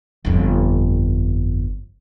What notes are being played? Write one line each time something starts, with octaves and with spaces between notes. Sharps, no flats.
G1 F2